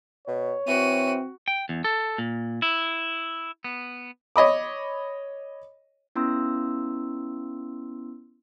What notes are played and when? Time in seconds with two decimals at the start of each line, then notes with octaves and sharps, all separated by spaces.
0.27 B2 C#5
0.67 E3 C4 F#4 D#7
1.48 G5
1.69 E2
1.84 A4
2.18 A#2
2.62 E4
3.64 B3
4.36 C#5 D#5 B5 D6
6.16 B3 C#4 E4 C6 E6